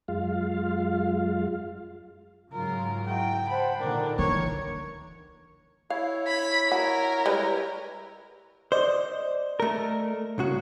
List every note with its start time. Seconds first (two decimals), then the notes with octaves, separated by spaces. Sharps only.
0.08 F#2 G#3 F4 F5
2.52 G#2 C#3 F#3 F4 A#4
3.06 E4 F#4 G5
3.48 C5 F#5 A5 B5
3.80 A#2 D3 D#3 D4 A#4 A#5
4.19 E3 C#5
5.90 E4 C#5 F5
6.27 B5
6.72 F#4 A#4
7.26 G3 G#3 B4
8.72 C5 D5 D#5
9.60 A3 A#4
10.38 C2 C#3 F#4